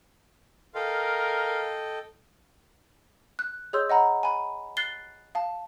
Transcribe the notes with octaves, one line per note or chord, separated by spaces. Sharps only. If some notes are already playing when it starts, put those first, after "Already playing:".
A4 A#4 D#5 F5 G5
F#6
G#4 C#5 D#5 C6 E6 G6
D#5 F#5 A#5 B5
G#5 B5
F#6 A6 C7 G7
F5 A5